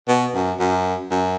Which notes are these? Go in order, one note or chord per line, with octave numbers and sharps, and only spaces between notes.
B2
F#2
F#2
F#2